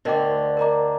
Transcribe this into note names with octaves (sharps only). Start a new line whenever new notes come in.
D2 D3 A#4 D#5 G5 D6
A#4 D#5 A#5 D6